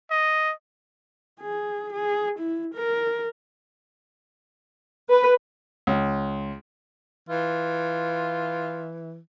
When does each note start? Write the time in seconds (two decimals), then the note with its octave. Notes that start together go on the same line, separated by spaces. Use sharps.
0.11 D#5
1.41 G#4
1.93 G#4
2.39 E4
2.74 A#4
5.10 B4
5.87 C#2
7.29 E3 F4